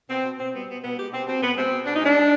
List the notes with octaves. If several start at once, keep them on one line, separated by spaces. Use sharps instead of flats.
B2 C4
B2
B2 C4
G3 B3
B2 B3
B2 B3
G#3 G4
B2 C4
B2 C4
B2 B3
G#3 C4
B2
B2 D4
D#4
G#3 D4
G3